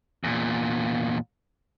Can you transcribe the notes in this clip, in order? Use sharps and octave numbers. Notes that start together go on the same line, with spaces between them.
E2 A#2